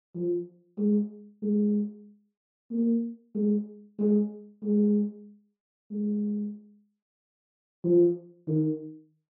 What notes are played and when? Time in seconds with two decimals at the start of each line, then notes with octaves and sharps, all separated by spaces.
0.15 F3
0.78 G#3
1.42 G#3
2.71 A#3
3.35 G#3
3.99 G#3
4.63 G#3
5.91 G#3
7.84 F3
8.48 D#3